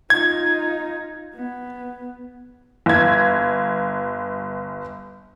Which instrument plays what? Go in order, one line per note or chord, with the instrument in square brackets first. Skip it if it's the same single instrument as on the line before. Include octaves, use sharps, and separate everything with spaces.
[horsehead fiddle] D#4 F4 [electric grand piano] G#6
[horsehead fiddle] B3
[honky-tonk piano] G1 G#6